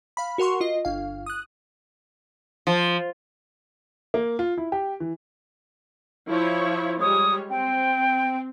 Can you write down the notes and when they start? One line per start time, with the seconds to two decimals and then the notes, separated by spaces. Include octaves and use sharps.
0.17 F5 B5
0.38 F#4 A#4 F#5 C6 C#6
0.60 F4 D#5
0.85 G1 F5
1.26 D#6 F#6
2.67 F3
4.14 A#3
4.39 F4
4.58 E4
4.72 G4
5.00 E3
6.28 F3 E4 C#5
7.01 G3 G#3 C#5 D#6
7.50 C4 G5